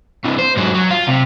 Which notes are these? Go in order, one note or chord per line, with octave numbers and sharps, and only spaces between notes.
C3 E3
C5
G#2 F#3
F#3
F4
C3